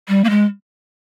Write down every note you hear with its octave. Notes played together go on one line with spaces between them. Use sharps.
G3
A#3
G#3